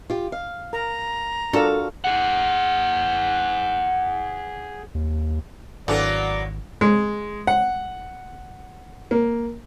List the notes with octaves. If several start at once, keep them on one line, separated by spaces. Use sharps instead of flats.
F4 G4
F5
A#4 A#5
D4 F4 F#4 A4 A#4 F5
G#4 F#5
D#2
G#1 E3 F#3 A#3 B3 D4 A4 D5
G#3
F#5
A#3